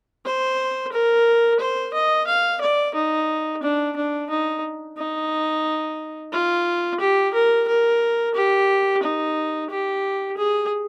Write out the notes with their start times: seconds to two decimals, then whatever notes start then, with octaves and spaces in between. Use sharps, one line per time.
0.26 C5
0.92 A#4
1.60 C5
1.94 D#5
2.27 F5
2.61 D5
2.95 D#4
3.63 D4
3.96 D4
4.30 D#4
4.97 D#4
6.32 F4
7.00 G4
7.34 A#4
7.68 A#4
8.35 G4
9.03 D#4
9.70 G4
10.37 G#4